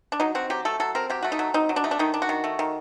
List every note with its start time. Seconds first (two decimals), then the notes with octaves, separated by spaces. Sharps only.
0.12 D4
0.20 F#3 D#4
0.35 C4 F#4
0.50 F#3 G4
0.65 A3 A4
0.80 F#3 A4
0.95 C4 A#4
1.10 F#3 G4
1.23 A3 F#4
1.32 D#4
1.39 F#3
1.54 C4 D#4
1.69 F#3
1.76 D4
1.84 A3 D#4
1.91 D4
1.99 D#3 D#4
2.14 D4
2.22 F#4
2.29 D#3
2.44 A3
2.59 D#3